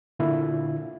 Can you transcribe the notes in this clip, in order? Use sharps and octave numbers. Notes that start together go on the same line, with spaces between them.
A#2 D3 E4 F4